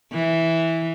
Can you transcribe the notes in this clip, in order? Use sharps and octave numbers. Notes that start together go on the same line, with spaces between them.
E3